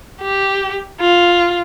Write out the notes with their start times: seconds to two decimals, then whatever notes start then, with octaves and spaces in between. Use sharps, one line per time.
0.22 G4
1.01 F4